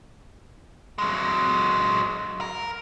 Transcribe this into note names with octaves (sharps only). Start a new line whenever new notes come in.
F#3 G#3
A#4